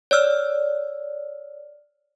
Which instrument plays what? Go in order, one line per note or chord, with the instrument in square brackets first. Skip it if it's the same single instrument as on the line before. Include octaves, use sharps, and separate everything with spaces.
[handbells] C#5 D5 E6 F6